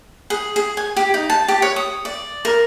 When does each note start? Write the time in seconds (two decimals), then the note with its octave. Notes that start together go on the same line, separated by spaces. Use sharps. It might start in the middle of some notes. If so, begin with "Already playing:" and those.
0.30 G#4
0.56 G#4
0.77 G#5
0.96 G4
1.14 D#4
1.30 A5
1.48 G4
1.62 C#5
1.76 D#6
2.05 D5
2.45 A#4